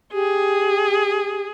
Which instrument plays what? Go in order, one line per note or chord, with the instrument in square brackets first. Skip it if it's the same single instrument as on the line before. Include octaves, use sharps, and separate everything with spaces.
[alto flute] G4 [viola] G#4